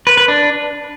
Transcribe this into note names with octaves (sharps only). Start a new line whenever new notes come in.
B4
B4
D4